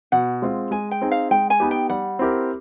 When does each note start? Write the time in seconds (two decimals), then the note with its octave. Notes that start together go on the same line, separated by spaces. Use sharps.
0.12 B2 F#5
0.42 G#3 C4 F4
0.71 G#3 G#5
0.91 G5
1.01 C4 D#4 G#4
1.11 F5
1.31 G#3 G5
1.50 G#5
1.60 B3 D#4 G4
1.71 G5
1.90 G3 F#5
2.19 C4 E4 G4 A#4